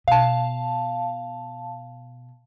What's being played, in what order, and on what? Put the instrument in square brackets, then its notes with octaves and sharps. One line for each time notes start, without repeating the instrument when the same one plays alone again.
[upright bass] B2 [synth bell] F5 A5